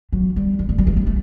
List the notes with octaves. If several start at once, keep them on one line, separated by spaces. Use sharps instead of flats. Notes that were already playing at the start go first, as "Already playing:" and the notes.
F#3
G3
G3
A3
G3
A3
G3
A3